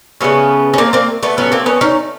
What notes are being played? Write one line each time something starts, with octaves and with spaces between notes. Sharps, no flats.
C#3 F#3 A3 B3 C#4
C#4
A#3 C4
A#3 C4
A3 B3
A2 F#3 A3 B3 C#4
A#3 C4
B3 C#4
C#4 D#4